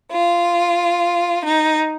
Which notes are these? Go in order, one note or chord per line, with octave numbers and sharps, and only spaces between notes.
F4
D#4